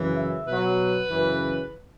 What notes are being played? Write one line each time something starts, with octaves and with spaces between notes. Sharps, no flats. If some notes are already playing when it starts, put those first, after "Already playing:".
Already playing: F#2 C#3 E3
E5
B2 F#3 B4
F#2 C#3 E3